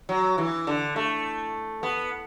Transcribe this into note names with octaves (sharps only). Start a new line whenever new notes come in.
F#3
E3
D3
A3
B3